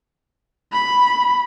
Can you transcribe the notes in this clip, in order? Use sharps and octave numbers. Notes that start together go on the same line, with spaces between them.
B5